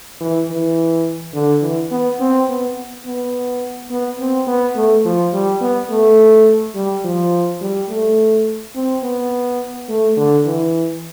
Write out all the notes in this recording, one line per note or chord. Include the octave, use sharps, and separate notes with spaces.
E3
E3
D3
E3
B3
C4
B3
B3
B3
C4
B3
A3
F3
G3
B3
A3
G3
F3
G3
A3
C4
B3
A3
D3
E3